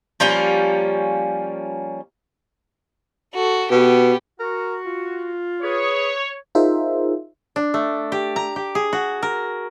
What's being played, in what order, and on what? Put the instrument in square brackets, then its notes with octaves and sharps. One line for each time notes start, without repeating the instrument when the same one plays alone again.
[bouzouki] F3 G3 A#3 C#4
[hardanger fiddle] F#4 A4
[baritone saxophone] B2 [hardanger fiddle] B3 G4
[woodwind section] F#4 [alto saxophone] A#4
[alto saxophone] F4
[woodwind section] G#4 B4 D#6 [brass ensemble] C#5
[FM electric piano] D#4 F4 G#4 A#4 C5 E5
[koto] D4
A3
G4
A#5
G4
G#4
F#4
A#4